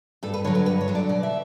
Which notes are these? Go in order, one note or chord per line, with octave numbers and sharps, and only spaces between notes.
G2 A4
B4
D3 F#3 C#5
B4
G2 B4
C#5
D3 F#3
D5
B2 D5
E5